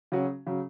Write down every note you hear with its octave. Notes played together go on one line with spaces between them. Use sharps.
C#3 F#3 C#4 F#4
C#3 F#3